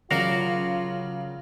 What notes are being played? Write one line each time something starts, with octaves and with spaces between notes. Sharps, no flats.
C#3 F#3 F4 F#4 A#4 D5 F5